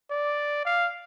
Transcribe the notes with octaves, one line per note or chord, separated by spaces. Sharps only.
D5
F5